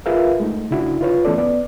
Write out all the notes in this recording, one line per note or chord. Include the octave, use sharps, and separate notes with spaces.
F4 G#4 A#4 B4 E5 F5
G#3 A3 D#4
C#3 D4 E4 F#4
D#4 F4 B4 C#5
E3 A3 B3 C#4 A4 D5
B3 D5